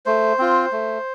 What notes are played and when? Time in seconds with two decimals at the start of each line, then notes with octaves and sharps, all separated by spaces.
0.06 A3 C5
0.39 C4 F4
0.72 A3